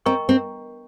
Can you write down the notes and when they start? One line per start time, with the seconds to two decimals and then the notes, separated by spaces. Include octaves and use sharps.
0.06 C4 A#4 D#5 G5 A#5 C#6
0.29 C4